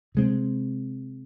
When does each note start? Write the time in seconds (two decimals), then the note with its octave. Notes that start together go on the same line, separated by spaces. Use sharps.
0.15 C3 G#3 C4